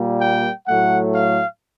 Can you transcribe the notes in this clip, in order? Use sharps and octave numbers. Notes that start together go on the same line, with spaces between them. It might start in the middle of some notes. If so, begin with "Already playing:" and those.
Already playing: A#2 G3 A#3
G5
A2 F#3 A3 F#5
F5